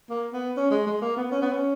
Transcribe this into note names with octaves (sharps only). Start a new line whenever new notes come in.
A#3
B3
C#4
G#3
G#3
A#3
B3
C#4
B3
C#4